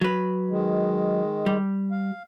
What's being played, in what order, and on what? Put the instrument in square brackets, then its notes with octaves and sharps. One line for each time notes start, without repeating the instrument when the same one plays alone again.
[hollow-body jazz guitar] F#3 B4
[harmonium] D#3 G#3
[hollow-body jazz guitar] G3
[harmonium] F5